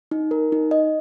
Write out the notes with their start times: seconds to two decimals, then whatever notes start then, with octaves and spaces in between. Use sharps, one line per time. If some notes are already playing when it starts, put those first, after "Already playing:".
0.11 D#4
0.31 A#4
0.52 D#4
0.71 D#5